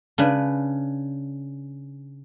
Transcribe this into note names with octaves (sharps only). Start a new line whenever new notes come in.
C#3 D4 B4